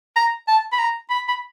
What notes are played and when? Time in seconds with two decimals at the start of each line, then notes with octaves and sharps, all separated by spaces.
0.16 A#5
0.47 A5
0.72 B5
0.79 A#5
1.10 B5
1.28 B5